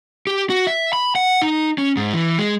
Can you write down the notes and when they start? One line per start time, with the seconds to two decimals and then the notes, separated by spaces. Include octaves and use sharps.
0.27 G4
0.50 F#4
0.67 E5
0.93 B5
1.15 F#5
1.42 D#4
1.78 C#4
1.97 G#2
2.14 E3
2.38 G#3